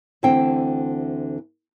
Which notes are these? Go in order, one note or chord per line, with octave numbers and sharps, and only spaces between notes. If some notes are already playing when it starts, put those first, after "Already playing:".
D2 D3 E3 C4 G5